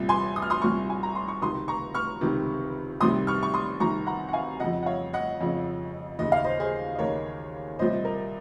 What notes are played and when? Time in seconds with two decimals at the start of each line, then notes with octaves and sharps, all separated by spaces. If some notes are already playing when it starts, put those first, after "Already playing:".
Already playing: C2 A#2
0.09 G#5 C6
0.36 D#6
0.42 F6
0.50 C6 D#6
0.62 C2 A#2 C#6 F6
0.90 G#5
1.03 A#5
1.15 C6
1.28 C#6
1.42 C#2 C3 D#3 C6 D#6
1.68 A#5 C#6
1.94 C#6 F6
2.21 C#2 C3 D#3
3.00 C2 C3 D#3 C6 D#6
3.27 C#6 F6
3.43 C#6
3.54 C6 D#6
3.80 C2 C3 D#3 A#5 C#6
4.07 F#5 A#5
4.29 F#5
4.33 F5 G#5
4.60 C#3 D#5 F#5
4.64 F2
4.83 F#5
4.86 C#5 F5
5.13 D#5 F#5
5.40 F2 C#3
6.19 D#2 C#3 D#5
6.32 F5
6.44 C5 D#5
6.60 G#4 C5
6.95 D#5
6.99 D#2 C#3 A#4 C#5
7.79 C2 A#2 C5 D#5
8.05 A#4